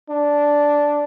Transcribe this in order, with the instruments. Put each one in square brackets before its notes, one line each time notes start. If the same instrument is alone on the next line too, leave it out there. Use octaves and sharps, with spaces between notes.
[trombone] D4